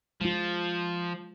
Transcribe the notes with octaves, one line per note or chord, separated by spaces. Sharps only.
F3 G#3 F4